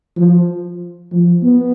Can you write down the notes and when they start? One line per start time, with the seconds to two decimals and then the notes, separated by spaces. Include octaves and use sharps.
0.16 F3
1.12 F3
1.43 B3